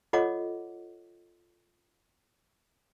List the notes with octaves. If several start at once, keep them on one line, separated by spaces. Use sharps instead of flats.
F4 A4 C#5 D#5 F#5 D6